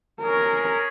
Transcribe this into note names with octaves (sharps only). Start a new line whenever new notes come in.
C#4 G#4 A#4 C#5